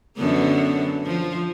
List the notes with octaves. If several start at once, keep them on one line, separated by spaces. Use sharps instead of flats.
F#2 D3 B3
F3